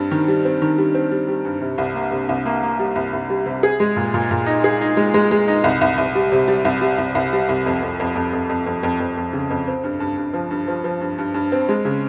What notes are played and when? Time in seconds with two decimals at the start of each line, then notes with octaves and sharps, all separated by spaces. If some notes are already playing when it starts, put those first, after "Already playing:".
Already playing: G2 G3 C4
0.11 D#3
0.28 G3
0.45 C4
0.62 D#3
0.78 G3
0.94 C4
1.11 G3
1.28 G3
1.45 G2
1.61 C3
1.78 C2
1.95 A#3
2.12 C3
2.29 C2
2.46 A#3
2.63 A#3
2.79 G3
2.95 C2
3.13 C2
3.30 G3
3.46 C3
3.63 G#4
3.80 G#3
3.96 A#2
4.14 A#2
4.31 A#2
4.46 D#4
4.64 G#4
4.81 D#4
4.97 G#3
5.14 G#3
5.31 G#3
5.48 D#4
5.64 C2
5.81 C2
5.98 C2
6.15 G3
6.32 C3
6.48 G3
6.65 C2
6.81 G3
6.98 C2
7.15 C2
7.33 G3
7.49 C2
7.66 F2
7.82 F2
8.00 F2
8.15 F2
8.33 F2
8.49 F2
8.66 F2
8.83 F2
9.00 F2
9.17 F2
9.33 C#3
9.50 F2
9.68 C4
9.84 G2
10.00 G2
10.17 G2
10.33 F3
10.51 G2
10.68 F3
10.84 F3
11.01 G2
11.18 G2
11.34 G2
11.52 C4
11.69 G#3
11.85 C#3